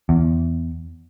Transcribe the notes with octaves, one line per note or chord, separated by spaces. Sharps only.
E2